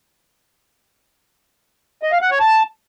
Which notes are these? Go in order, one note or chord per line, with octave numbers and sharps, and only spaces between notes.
D#5
F5
F#5
C#5
A5